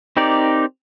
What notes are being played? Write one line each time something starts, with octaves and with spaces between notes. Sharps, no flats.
C4 D#4 G4 A#4 D5